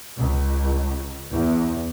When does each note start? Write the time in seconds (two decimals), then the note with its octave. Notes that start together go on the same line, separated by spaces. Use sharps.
0.18 C#2
1.30 E2